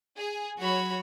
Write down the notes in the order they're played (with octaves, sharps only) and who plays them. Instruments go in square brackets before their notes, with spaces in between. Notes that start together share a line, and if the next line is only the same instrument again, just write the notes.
[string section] G#4
[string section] F#3 C#5 [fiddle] F#4 B5